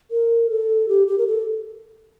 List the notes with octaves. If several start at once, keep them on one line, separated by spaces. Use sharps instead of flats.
A#4
A4
G4
G4
A#4
A4